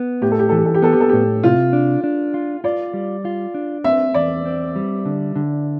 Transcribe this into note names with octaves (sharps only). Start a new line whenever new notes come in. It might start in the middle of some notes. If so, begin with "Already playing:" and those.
Already playing: B3
A2 G4
A4
G4
E3 A4
G4
A4
G4
B3 A4
G4
A4
A2 G4
C3 F4
D4
D4
F4
F4 D5
G3
F4
D4
C4 E5
E2 D5
C4
G3
D3
D3